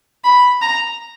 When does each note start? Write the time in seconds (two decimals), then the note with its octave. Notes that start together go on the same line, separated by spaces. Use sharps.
0.24 B5
0.62 A#5